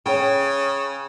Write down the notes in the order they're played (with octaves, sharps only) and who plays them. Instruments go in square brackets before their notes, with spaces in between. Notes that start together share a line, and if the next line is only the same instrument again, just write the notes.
[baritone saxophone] C#3 [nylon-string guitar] C#5 G5